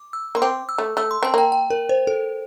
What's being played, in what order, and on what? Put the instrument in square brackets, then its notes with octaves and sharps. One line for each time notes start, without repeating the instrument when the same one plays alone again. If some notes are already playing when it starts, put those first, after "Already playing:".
Already playing: [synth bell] D6
E6
[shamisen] A#3 [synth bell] C6
[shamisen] C4 [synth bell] D6
[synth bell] E6
[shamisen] A3
[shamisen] A3 [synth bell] E6
[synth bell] C6
[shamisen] C4 [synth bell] A5
[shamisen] A#3 [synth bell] G5
[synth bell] G5
A#4
C5
A4